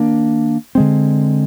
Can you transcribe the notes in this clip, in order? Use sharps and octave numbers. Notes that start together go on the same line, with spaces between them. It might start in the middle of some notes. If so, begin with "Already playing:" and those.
Already playing: D#3 A#3 D4
D3 G#3 C4